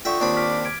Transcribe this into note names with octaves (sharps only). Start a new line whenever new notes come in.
D3 F4 E5 G5 C#6 D#6
D#2 C4 D4 B5
D6 F6 B6
G#6 D7